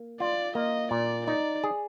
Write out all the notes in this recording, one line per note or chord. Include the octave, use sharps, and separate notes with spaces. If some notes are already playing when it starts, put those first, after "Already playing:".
Already playing: A#3
F4 D5
A#3 D#5
A#2 D5
D#4 D5
G#4